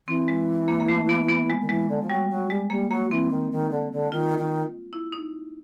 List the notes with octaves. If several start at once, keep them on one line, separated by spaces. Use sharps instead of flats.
E3 C4
G#3
A#3
A#3
A3
B3
B3
G#3
D#3
E3 G#3
D3
F3
F#3 G3
F#3
G3 G#3
G3 A#3
F#3 A#3
E3 C4
D#3
D#3
D3
D3
D#3 F4
D#3
E4
D#4